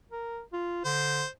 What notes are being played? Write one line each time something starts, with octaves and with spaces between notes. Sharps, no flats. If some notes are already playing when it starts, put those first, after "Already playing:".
A#4
F4
D3 C5